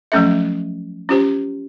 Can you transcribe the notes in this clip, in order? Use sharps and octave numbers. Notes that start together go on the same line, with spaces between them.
F3 F#3 A3 C#4 A4 E5
C#4 F4 G4 C5